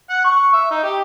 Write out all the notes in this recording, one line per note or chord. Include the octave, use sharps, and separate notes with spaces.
F#5
C#6
E5
D#4
G4